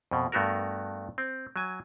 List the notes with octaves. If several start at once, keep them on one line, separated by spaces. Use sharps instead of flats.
F2 B2
G2 A3 B3 F#4 A#4
C4
F#3 G#5